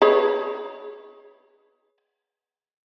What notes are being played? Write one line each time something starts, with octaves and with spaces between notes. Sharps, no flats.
G#4 B4 C#5